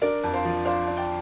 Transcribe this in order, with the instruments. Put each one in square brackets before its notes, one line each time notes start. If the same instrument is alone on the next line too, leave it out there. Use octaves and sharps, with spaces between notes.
[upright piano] D4 A#4 D5
F2
C5 F5
F3
D4 C5 F5
D4
D5 G5